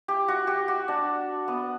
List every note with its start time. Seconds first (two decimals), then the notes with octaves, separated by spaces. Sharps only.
0.08 G4
0.28 F#4
0.47 G4
0.68 F#4
0.88 D4
1.48 B3